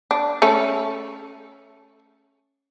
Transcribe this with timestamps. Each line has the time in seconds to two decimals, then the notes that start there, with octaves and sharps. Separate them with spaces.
0.11 D4
0.42 A3 C#4 A4